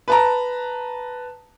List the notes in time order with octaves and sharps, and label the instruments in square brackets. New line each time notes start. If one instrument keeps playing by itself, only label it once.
[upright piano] B4 A5 A#5